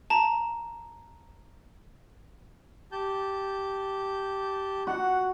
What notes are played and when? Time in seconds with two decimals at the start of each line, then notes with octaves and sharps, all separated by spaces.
0.10 A5 A#5
2.92 G4 A5 G6
4.87 F#4 F#5